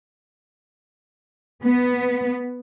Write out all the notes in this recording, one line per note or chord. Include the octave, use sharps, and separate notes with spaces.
B3